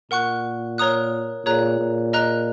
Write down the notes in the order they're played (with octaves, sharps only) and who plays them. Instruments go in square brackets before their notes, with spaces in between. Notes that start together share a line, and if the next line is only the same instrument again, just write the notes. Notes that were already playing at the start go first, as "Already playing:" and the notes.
[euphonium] A#2 [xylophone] A#4 F#5 C#6 F#6
[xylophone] A#4 C#5 A#5 D#6 F#6
[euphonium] A#2 [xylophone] G#4 C#5 A#5 F#6
[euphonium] A#2
[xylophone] A#4 D#5 A#5 F#6